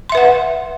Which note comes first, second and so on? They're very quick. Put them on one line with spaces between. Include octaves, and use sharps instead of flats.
C6 E5 B4 F#5